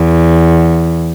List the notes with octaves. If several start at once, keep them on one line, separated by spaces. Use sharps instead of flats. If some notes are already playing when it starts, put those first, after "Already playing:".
Already playing: E2